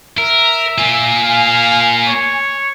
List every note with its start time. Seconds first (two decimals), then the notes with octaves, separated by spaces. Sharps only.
0.18 A#4 E5
0.78 A#3 F4 G#5
1.23 F5
2.08 C#5